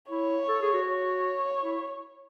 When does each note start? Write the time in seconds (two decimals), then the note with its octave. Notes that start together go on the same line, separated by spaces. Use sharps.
0.11 E4 C#5
0.48 A4
0.62 G#4
0.74 F#4
0.87 C#5
1.64 E4